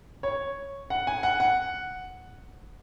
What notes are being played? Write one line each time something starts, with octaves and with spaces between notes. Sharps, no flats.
C#5
F#5
G#5
F#5
F#5